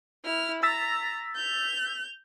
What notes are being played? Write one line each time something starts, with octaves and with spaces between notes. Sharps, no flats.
E4 F6
A#5 E6 A6 B6
G6 F7